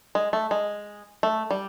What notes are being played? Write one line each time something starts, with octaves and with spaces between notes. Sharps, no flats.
G#3
A3
G#3
A3
G3